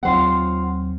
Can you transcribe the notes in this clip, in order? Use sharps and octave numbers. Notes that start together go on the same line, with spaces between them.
D#2 F#3 C4 F4 C5 F#5